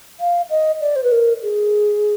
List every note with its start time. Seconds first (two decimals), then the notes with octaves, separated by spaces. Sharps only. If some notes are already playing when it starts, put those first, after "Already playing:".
0.20 F5
0.50 D#5
0.81 D5
0.96 C5
1.04 B4
1.12 A#4
1.43 G#4